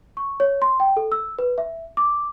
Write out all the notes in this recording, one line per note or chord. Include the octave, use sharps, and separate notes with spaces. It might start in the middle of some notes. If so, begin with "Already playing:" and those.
C#6
C#5
C6
G5
A4
E6
B4
E5
D6